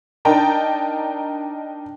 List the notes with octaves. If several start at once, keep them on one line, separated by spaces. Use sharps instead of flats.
D4 D#4 A#4 G5 A5 A#5